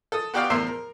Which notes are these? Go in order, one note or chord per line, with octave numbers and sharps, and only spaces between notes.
A4 D#6
B3 F#4 G4 D5 F5 G5
E2 A2 A#4 C5 E5 C6
A#4